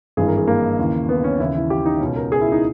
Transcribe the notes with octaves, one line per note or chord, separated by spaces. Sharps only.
G#1 G2 E3 G#4
A#4
G#4
A#3
D#2 C#3 E3
B3
C#4
D#2 C#3 E3 E4
E4
G4
D#4
C#2 B2 C#4
A#4
G#4
E4
D#4